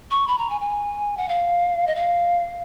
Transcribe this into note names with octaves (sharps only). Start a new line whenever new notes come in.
C#6
B5
A#5
G#5
G#5
F#5
F5
D#5
F5